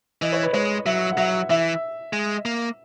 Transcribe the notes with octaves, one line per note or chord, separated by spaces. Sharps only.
E3 D#5
C#5
B4
G#3 C#5
F#3 E5
F#5
F#3 E5
E3 E5
G#3
A#3